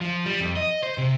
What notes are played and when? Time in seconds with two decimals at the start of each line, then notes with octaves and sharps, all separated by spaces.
0.01 F3
0.26 G3
0.40 F2
0.56 D#5
0.83 C5
0.98 C3